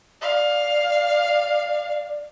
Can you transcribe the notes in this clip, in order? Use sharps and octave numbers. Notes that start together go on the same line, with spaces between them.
D5 F5